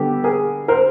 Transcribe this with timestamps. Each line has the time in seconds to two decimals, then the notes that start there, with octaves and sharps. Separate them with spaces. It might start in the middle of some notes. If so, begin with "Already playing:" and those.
Already playing: D3 G3 B3 G4 A4
0.24 G#4 A#4
0.68 A#4 C5